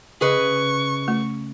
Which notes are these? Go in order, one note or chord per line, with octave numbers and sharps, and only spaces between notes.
C#3 G#4 B4 D#5 C#6
A3